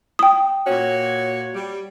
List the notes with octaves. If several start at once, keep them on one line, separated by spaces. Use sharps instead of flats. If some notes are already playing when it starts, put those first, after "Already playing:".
G5 D#6
A#2 F#4 C#5
G3